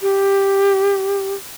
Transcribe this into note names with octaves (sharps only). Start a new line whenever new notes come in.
G4